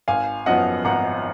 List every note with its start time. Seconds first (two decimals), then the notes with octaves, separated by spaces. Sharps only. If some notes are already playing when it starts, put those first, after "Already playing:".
0.08 G#1 F5 G#5
0.46 F#2 F3 B3 D#5 F#5
0.85 G#1 F#5 A#5